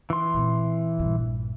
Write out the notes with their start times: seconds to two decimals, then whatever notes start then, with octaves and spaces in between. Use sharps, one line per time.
0.10 E3 C6
0.34 A#2 C4
0.99 A#1 G2